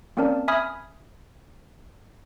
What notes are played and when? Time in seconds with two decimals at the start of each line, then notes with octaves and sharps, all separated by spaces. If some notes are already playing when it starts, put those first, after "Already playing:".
0.17 A#3 C4 C#4 A#4 D5 A5
0.48 E5 G#5 B5 D#6 F6 G#6